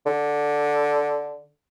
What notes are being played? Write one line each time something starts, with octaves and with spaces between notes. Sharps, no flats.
D3